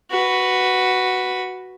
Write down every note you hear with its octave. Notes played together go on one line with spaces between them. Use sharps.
F#4 B4